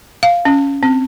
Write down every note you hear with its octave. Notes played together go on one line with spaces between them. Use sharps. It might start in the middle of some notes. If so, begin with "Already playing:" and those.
F5
C#4
C4